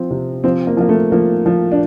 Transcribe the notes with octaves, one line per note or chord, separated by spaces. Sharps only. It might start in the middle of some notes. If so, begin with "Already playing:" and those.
Already playing: F3 C4
C3
F3 C4
A#3
F3 A#3
A3
F3 A#3
F3
D4